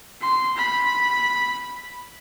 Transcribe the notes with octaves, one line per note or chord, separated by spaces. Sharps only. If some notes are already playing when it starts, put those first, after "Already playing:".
C6
B5